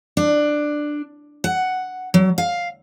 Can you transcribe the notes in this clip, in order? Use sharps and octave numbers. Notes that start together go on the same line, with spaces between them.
D4
F#5
F#3
F5